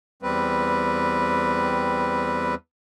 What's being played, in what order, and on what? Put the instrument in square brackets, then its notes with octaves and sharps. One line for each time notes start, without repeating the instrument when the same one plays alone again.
[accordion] E2 G3 C4 B4